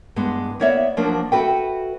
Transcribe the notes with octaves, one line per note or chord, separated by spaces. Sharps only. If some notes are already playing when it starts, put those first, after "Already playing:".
G2 G#3 B3
A#3 B3 C#5 D5 E5
F3 F#3 A#3 D4 C#5
F#4 A4 B4 E5 G5